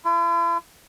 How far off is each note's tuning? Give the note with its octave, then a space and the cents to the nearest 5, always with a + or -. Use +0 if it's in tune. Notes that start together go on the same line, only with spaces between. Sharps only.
E4 +45